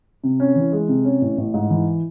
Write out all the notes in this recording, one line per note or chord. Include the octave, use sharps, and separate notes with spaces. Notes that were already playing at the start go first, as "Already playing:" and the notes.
C3
C#4
E3
G#3
C3
C#4
A1
A1
G#2
E3